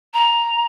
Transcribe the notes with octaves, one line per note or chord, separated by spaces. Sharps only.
A#5